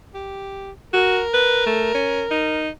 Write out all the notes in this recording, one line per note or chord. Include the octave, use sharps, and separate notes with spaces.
G4
F#4 A#4
B4
A3
C#4
D#4